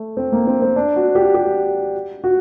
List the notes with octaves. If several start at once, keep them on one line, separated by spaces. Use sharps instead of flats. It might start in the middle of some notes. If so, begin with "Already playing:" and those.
Already playing: A3
C4
A#3
C4
C4
D4
F#4
G4
G4
F#4